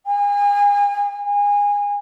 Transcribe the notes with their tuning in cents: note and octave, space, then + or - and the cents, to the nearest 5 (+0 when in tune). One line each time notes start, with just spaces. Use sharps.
G#5 -35
G#5 -25